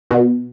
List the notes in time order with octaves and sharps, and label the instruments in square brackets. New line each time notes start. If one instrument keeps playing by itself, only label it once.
[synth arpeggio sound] B2